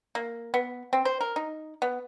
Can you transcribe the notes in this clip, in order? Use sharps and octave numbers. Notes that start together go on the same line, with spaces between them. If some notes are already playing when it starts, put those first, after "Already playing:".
A#3
B3
C4
C5
A#4
D#4
B3